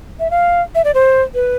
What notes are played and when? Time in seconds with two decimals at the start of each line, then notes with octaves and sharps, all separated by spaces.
0.20 E5
0.31 F5
0.75 E5
0.84 D5
0.94 C5
1.34 B4